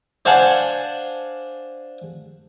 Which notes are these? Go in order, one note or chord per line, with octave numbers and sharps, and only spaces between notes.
D4 C5 F5 F#5 G#5 A5